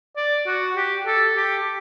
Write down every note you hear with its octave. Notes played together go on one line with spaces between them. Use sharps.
D5
F#4
G4
A4
G4